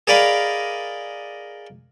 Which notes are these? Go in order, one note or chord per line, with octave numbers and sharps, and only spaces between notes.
G#4 A#4 D5 D#5 F5 B5